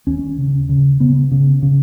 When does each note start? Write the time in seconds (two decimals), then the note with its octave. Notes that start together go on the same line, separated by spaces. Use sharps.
0.07 D#2 C#4
0.38 C#3
0.69 C#3
1.00 C#3 B3
1.31 C#3
1.62 C#3